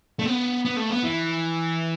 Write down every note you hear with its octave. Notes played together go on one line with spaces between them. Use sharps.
A3
B3
B3
A3
B3
E3